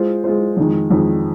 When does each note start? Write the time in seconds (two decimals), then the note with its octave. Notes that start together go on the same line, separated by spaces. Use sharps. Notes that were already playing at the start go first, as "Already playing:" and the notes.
Already playing: G#3 F4 C5
0.24 G#3 F4 C5
0.57 F2 D#3 G#3
0.91 F2 D#3 G#3